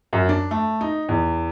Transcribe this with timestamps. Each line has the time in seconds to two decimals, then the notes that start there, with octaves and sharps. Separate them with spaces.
0.13 F#2
0.29 D4
0.51 A3
0.81 D#4
1.08 E2